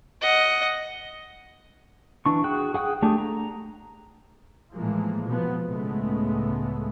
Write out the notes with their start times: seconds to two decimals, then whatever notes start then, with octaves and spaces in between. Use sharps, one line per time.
0.21 D#5 F#5
2.26 E3 D4 C#6
2.44 F#4 G#4 G5 F#6
2.74 G#4 F#5 G5 D#6 F#6
3.02 A3 D4 G4 G#4
3.18 A#5
4.75 A2 E3 F3 G#3 A#3
5.25 B2 F3 B3
5.67 C#2 A2 C#3 G#3 A3 B3